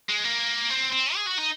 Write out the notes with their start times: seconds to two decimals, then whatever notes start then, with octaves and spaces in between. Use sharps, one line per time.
0.09 G#3
0.24 A#3
0.70 C4
0.93 C4
1.15 G#4
1.27 F#4
1.39 D#4